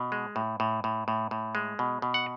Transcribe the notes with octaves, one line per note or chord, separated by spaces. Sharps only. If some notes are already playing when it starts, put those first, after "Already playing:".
Already playing: B2
G#3
A2
A2
A2
A2
A2
G#3
B2
B2
F#5